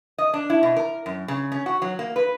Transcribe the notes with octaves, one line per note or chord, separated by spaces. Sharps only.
D#5
D4
E4
B2
A#4
F#2
C#3
C#4
F#4
F#3
A#3
B4